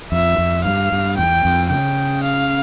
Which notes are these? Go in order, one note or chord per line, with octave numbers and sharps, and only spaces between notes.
F2 E5
F2
G2 F5
G2
E2 G5
F2
C#3 G5
F5